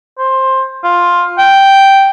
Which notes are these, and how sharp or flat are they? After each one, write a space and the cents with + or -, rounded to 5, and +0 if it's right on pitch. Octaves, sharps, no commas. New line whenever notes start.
C5 +15
F4 +5
G5 -5